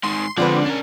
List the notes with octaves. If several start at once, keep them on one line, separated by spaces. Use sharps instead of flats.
G#2 D#3 C6
D3 F3 G#3 C4 B4 D5
C#4 D4 A#4